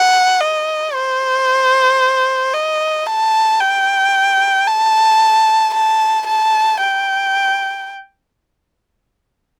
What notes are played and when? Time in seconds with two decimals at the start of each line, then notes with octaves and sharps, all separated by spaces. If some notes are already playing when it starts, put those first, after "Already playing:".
Already playing: F#5
0.40 D#5
0.94 C5
2.53 D#5
3.06 A5
3.60 G5
4.67 A5
5.74 A5
6.27 A5
6.81 G5